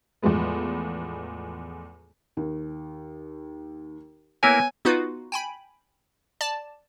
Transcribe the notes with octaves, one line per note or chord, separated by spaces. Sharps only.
E2 A2 F3 G#3 B3
D#2
A#3 B3 E4 A#4 C#5 G#5 E6 F#6
B3 D#4 F4 F#4 B4
G5 G#5 B5
D5 A5